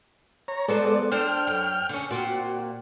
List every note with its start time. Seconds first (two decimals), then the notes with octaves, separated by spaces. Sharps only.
0.48 C#5 A#5
0.68 F3 G#3 B3 A4 C5 D5
1.12 D4 A4 C5 G5 F6
1.47 F#2
1.89 D3 C#4
2.10 A#2 C4 F#4